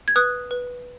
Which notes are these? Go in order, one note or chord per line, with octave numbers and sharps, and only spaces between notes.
G#6
B4 D#6 F#6
B4